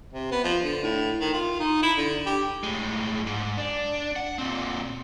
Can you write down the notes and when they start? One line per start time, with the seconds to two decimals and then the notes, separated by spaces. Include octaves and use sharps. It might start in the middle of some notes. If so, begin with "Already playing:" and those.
0.13 C3
0.31 B3
0.44 F3
0.64 D3
0.84 A2
1.20 D#3
1.34 F4
1.60 D#4
1.83 E4
1.97 D3
2.26 G4
2.64 A2 G#3
3.26 G#2
3.57 D4
4.16 F#5
4.38 A#2 C4